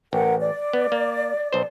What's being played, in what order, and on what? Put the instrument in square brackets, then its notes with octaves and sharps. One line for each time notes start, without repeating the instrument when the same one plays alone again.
[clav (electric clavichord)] A1 [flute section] A#4 F#5 G5
[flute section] D5
[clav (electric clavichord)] B3
A#3
B1 C5